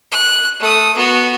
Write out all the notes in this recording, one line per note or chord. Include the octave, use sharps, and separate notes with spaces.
F#6
A3 D#6
B3 F#4